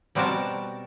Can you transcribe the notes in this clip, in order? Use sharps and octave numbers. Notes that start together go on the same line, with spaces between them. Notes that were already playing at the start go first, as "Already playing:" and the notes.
B2 G3 C4 F#4 A#4 A5